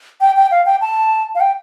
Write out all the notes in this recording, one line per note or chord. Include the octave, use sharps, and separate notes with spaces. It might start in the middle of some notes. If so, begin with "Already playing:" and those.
G5
G5
F5
G5
A5
F5
G5